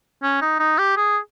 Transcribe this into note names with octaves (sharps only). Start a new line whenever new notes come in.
C#4
D#4
D#4
G4
G#4